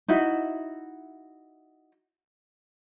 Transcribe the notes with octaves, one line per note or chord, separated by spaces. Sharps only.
D#4 E4 F#4 E5